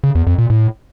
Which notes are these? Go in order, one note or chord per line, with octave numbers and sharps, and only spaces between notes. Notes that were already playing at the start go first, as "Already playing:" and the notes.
C#3
E2
F2
A#2
A2